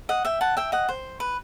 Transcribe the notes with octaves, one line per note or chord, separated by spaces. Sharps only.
D#5 F#5
E5 G5
F#5 A5
E5 G5
D#5 F#5
C5
B4